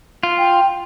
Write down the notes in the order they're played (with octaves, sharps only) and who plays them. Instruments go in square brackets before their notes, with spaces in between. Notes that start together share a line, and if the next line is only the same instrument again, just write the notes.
[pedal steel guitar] F4
[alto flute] G5